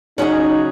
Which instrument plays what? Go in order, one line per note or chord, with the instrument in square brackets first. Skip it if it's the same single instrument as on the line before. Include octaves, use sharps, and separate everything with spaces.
[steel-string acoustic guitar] C#3 F#3 C#4 G#4 [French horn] D#4